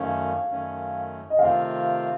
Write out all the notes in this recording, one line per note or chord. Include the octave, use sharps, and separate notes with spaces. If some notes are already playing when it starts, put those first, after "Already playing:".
Already playing: F#2 D#3 A3 C#4 F5
F#2 D#3 A3 C#4
D#5
C3 D#3 A3 C4 F4 F5